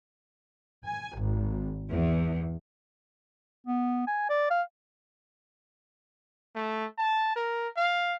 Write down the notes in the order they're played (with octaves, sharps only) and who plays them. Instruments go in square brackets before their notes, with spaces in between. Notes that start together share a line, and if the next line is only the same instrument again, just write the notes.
[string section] G#5
G#1
E2
[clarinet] B3
G#5
D5
F5
[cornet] A3
A5
A#4
F5